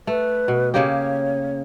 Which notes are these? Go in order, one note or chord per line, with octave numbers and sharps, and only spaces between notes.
A3 B4
B2
C#3 A#3 G4 C#5